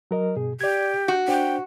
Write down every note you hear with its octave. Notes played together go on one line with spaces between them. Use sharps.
F#3 A#4 D#5
G2 B2 G#4
G4 D5 G#6
F#4 F#5
D4 C5 G5